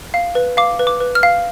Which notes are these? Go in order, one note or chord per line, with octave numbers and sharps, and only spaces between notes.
F5
B4
F5 D6
B4
D6
B4
F6
F5